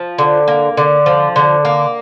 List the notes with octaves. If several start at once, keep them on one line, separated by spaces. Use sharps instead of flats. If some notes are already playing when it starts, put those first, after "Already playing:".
Already playing: F3
D3
A#3
D3
F3
D3
A#3